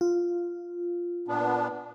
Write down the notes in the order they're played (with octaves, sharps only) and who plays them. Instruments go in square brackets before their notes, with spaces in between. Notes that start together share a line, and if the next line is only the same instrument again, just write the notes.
[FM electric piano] F4
[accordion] A#2 B3 D4